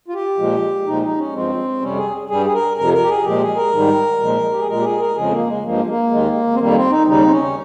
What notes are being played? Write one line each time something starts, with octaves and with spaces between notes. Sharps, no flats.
F4
G4
A#2 F3 G#3
A#2 F3 G#3 D#4
D#4
C#4
G2 F3 G#3 C4
F2 C3 G3 C#4
G#4
G2 G3 G#4
G#4
A#4
F2 C3 F3 A#4
A#4
G4
G#4
A#2 F3 G#3 G4
G#4
A#4
G#2 D#3 G3
A#2 F3 G#3
G4
G#4
A#2 G#3 A#4
G4
G#4
A#4
F2 C#3 F3 G#3 G#4
A#3
G#3
G2 F3 G#3 A#3
A#3
D#2 D#3 G#3
C4
F2 D#3 G3 A#3
C4
D#4
D#2 C#3 G3 D#4
C4
C#4